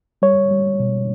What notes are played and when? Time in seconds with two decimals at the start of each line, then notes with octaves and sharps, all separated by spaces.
0.22 G3 C#5
0.51 G3
0.80 B2